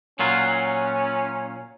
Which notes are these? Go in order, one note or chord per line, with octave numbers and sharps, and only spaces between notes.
A#2 F#3 C#4 F4